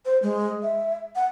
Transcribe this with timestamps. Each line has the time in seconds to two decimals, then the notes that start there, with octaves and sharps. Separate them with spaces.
0.06 C5
0.23 G#3
0.63 E5
1.16 F#5